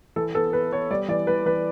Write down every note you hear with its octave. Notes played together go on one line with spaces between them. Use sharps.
E3 A4
B3 A4
B3 B4
B3 C#5
G3 D5
E3 D5
E3 B4
E3 B4